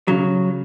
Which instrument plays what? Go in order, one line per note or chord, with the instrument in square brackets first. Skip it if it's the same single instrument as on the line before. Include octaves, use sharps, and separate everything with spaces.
[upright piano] C#3 [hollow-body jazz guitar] F#3